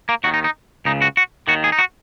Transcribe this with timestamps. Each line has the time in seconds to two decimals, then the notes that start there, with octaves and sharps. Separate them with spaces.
0.09 A#3
0.24 D#2 D#3 F#4
0.34 D#4
0.44 D#4
0.85 C#2 C#3 D#4
1.02 F#4
1.17 F#4
1.48 D#2 D#3 F#4
1.64 G#4
1.72 D#4
1.79 F#4